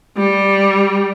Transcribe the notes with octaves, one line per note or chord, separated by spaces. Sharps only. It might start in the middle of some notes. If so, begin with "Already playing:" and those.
G3